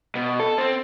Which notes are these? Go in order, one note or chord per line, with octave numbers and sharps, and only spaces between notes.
B2
A4
C4